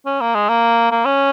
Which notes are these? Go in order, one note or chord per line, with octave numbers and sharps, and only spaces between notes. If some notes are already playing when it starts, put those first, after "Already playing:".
C#4
A#3
G#3
A#3
A#3
C#4